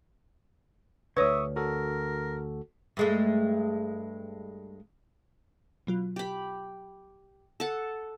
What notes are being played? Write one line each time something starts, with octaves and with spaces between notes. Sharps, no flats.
D2 D3 B4 C#5 E5 C#6 D#6
F#4 A4 A#4
G2 G#3 A3
B2 F#3 F4
G4 B5
A4 F#5